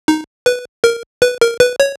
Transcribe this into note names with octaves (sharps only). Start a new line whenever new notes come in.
D#4
B4
A#4
B4
A#4
B4
C#5